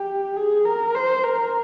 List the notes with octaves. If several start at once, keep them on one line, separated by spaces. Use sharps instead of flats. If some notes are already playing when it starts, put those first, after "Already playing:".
Already playing: G4
G#4
A#4
C5
A#4